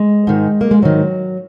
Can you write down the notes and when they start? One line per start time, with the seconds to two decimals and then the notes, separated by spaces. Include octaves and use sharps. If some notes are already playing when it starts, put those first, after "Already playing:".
Already playing: G#3
0.27 G#2 D#3
0.61 A#3
0.71 G#3
0.82 G#2 D#3 F#3